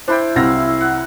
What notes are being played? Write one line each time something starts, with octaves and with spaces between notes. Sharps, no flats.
D4 E4 C5 G5 B5
C2 F#3 C4 F5 E6 A#6
F#5